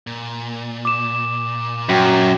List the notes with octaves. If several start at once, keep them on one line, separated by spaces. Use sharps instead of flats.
A#2
D6 E7
F#2 F#4 G5